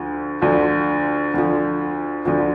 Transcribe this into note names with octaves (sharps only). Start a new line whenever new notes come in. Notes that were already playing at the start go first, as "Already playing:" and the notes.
Already playing: D2 D3 F3
D2 D3 F3
D2 D3 F3
D2 D3 F3